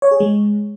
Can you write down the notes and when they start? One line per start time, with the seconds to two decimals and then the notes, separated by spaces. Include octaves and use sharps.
0.02 C#5
0.11 G#4
0.20 G#3